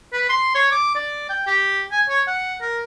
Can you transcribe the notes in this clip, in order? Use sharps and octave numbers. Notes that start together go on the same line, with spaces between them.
B4
C6
C#5
D6
D5
G5
G4
G#5
C#5
F#5
A#4